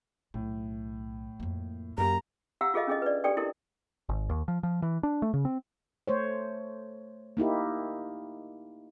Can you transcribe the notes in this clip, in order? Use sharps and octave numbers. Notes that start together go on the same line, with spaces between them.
B1 A2
F2 A#3
F#2 A#3 G4 A#5
G4 F5 F#5 A#5 C#6 E6
F4 G#4 A4 D#5 F5
C#4 D4 G#4 A4 D#5
B4 D5
D4 G4 A4 D5 G5 C#6
E4 G4 A4 A#4 D#5
G#1
D#2
F3
F3
E3
D4
A3
C#3
C4
A3 C5 C#5
A#3 D#4 E4 G4